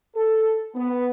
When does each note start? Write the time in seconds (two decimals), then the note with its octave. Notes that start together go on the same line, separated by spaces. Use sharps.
0.15 A4
0.75 B3